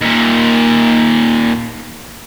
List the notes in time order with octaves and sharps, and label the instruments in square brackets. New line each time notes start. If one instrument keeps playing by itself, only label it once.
[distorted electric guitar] D#2 A#2